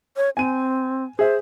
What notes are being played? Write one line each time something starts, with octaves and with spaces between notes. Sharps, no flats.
C#5
C4 G#5 D#7
G#4 C5 E5